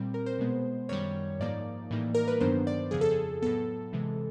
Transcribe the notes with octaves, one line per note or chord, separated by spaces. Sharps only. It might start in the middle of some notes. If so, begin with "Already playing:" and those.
Already playing: A#2 G3 C4
A#4
C5
B2 G#3 B3
F#2 D#3 G3 C#5
G#2 F3 A#3 D#4 D5
A2 E3 G3 A#3 D#4
A#4
B4
G2 D#3 F#3 B3 D4 C5
D5
F2 C#3 F3 G#4
A4
G#4
A2 F#3 B3 A4
C3 E3 G#3